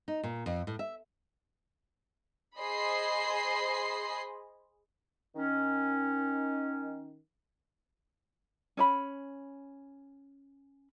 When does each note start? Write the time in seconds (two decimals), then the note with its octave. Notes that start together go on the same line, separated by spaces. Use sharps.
0.08 D#4
0.23 A#2
0.46 F2
0.67 A2
0.79 E5
2.59 G#4 C5 D#5 B5 C6 C7
5.35 D#3 C#4
8.77 C#4 D5 B5